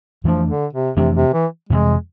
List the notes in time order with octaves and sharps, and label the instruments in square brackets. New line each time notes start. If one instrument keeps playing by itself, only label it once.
[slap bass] F2 E3 A3 D4 [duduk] F3
[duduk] D3
C3
[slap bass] F2 E3 A3 D4 [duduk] C3
[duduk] C3
E3
[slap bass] F2 C3 E3 [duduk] G#3